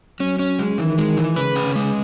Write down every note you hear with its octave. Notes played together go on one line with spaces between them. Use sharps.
F#3 C#4
C#4
G#3
D#3 E3
G#3
E3
C#3 B4
C#4
C#3
G#3